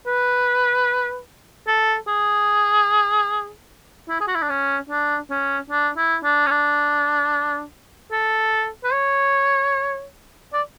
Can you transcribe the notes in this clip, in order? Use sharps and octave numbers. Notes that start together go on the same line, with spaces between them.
B4
A4
G#4
E4
G#4
F#4
E4
D4
C#4
D4
C#4
D4
E4
D4
C#4
D4
A4
B4
C#5
D5